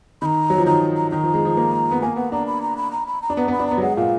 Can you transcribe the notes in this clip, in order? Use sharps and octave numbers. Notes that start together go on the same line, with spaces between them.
D#3 A#5 B5
F#3
F3
D#3 A#5
A#5
D#3 A#5
F3
G#3
F3
A#3
B3
A#3 G#5
B3 F#5
D4 A#5
B5
A#5
B5
A#5
B5
A#5
D4
B3 A#5
B3 B5
D4
B3 A#5
F#3
G#3 F#5
A#2 F5